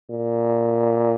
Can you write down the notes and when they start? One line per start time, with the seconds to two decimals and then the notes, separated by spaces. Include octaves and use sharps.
0.10 A#2